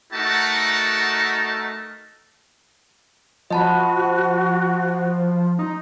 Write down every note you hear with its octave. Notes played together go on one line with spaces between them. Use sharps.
A3 D#4 F#4 A4 A#4 A5
F3 F#4 D#5 A5 B5
D#4